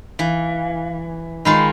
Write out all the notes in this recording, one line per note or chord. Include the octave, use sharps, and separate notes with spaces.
E3 F5
D#3 G#3 F4 B5